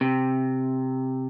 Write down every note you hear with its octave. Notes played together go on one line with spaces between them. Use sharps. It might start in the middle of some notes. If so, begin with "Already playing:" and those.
C3